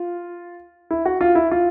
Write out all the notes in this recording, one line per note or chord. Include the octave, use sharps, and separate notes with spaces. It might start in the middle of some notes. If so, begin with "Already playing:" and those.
Already playing: F4
E4
F#4
F4
E4
F4